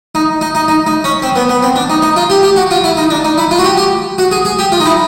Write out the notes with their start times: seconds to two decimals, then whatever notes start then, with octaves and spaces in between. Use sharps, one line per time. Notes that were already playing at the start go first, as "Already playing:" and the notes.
0.15 D#4
0.41 D#4
0.55 D#4
0.68 D#4
0.87 D#4
1.04 C#4
1.22 C4
1.36 B3
1.49 B3
1.63 C4
1.76 D4
1.90 D#4
2.02 D#4
2.16 F4
2.30 G4
2.43 G4
2.56 F#4
2.71 F4
2.84 E4
2.97 D#4
3.10 D4
3.25 D#4
3.38 E4
3.51 F4
3.59 F#4
3.64 G4
3.77 G4
4.18 F#4
4.31 G#4
4.45 G#4
4.59 G4
4.72 F4
4.80 D#4
4.86 E4